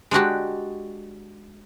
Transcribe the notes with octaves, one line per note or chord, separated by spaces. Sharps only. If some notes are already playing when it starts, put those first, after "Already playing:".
G#3 D4 F#4 G4